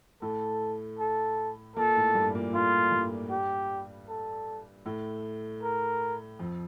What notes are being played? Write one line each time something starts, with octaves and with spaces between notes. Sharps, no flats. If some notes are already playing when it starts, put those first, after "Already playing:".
A2 A3 A4
A4
A#2 A#3 A4
A2 A3
G2 G3
A#2 A#3
A2 A3 F4
G2 G3
G4
A4
A2 A3
A#4
F2 F3